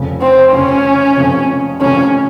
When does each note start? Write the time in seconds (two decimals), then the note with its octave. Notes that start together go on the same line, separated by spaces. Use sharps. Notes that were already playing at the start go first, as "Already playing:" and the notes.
Already playing: F1 F2 C#3
0.22 C4
0.53 F1 F2 C#3 C#4
1.17 F1 F2 C#3
1.81 F1 F2 C#3 C#4